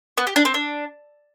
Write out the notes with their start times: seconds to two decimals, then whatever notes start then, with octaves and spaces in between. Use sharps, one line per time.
0.18 B3
0.27 G4
0.36 D4
0.45 C4
0.54 D4